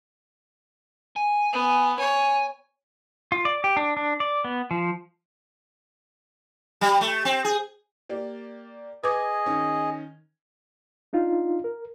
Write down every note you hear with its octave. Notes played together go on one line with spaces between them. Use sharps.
G#5
B3
C#5 G#5
F4
D5
G4
D4
D4
D5
B3
F3
G3
A3
C4
G#4
A#3 G4 D5
G#4 B4 D#5 D6 G#6
D#3 C#4
D4 D#4 F4 F5
A#4